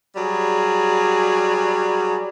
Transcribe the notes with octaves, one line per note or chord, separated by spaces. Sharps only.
F#3 G3 G#4